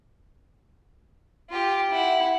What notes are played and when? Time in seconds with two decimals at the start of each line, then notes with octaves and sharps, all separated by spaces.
1.50 F4 G4
1.91 E4 F#5